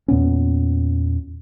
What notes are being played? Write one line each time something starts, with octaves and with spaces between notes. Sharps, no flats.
E2 A#2 B3 C#4